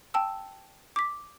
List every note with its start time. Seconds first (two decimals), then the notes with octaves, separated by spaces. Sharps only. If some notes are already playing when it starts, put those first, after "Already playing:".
0.14 G5 A5 E6
0.96 D6 B6